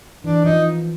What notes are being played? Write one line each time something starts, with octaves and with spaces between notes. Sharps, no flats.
E3 D4
F3 D#4